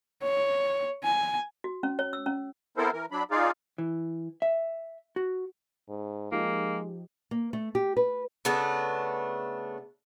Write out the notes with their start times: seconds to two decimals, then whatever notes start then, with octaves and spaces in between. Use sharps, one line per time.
0.23 C#5
1.04 G#5
1.64 F#4
1.83 C#4
1.99 C#5
2.13 E6
2.26 C#4
2.77 B3 C4 E4 A4 A#4 C5
2.93 E3 A#4
3.11 F#3 D4 B5
3.31 D#4 F4 G#4 D5 F5
3.78 E3
4.42 E5
5.16 F#4
5.89 G#2
6.32 F3 G#3 A#3 D#4 G4
7.31 A#3
7.53 A3
7.75 G4
7.97 B4
8.45 C#3 A3 B3 D4